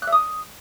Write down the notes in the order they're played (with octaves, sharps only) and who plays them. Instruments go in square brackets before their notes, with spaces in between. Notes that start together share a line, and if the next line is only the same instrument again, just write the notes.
[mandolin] F#6
E5
D#6